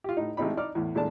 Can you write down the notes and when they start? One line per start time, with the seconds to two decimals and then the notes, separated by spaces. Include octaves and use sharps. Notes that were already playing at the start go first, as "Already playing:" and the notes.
0.04 F4 G4
0.17 A2 D#4
0.37 A1 G#3 C4 D#4 B5
0.57 D#4 D5 D6 F6
0.75 E2 A2
0.95 E2 A#2 G#3 A3 D4 A5